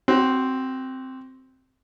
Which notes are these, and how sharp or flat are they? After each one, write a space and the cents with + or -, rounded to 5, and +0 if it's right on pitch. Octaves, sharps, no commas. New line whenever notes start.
C4 +0 F#4 +25